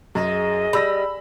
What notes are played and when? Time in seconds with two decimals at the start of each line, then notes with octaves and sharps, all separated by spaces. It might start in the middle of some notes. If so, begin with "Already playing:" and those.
0.15 F#2 G#3 D#5
0.73 G3 B5 E6 A#6